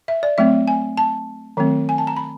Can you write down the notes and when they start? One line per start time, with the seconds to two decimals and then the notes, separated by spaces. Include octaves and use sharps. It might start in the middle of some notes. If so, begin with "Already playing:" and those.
0.08 E5
0.23 D5
0.38 F#3 A3 C4 E5
0.68 G#5
0.97 A5
1.57 D#3 F#3 A3 C4
1.89 G#5
1.98 A5
2.07 A#5
2.17 B5